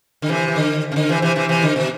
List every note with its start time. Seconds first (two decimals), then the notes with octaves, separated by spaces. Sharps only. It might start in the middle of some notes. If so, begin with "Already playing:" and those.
0.22 D3
0.29 C3 E3
0.48 E3
0.56 D3
0.92 C3
0.96 D3
1.09 C3 E3
1.22 C3 E3
1.35 C3 E3
1.49 C3 E3
1.62 D3
1.76 B2